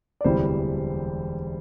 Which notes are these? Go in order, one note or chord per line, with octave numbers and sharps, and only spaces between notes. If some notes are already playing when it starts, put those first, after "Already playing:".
D5
E1 D2 C3 E3 G3 C5